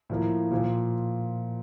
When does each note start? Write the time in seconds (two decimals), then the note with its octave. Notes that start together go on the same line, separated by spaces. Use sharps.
0.10 A2 F3 A#3
0.51 A#2 F3 A#3